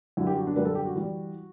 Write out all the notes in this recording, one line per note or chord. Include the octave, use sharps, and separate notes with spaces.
F#2 D3 G3 E4
G4
F#4
D4
F#2 D3 G3 B4
A4
G4
F#4
E3 G3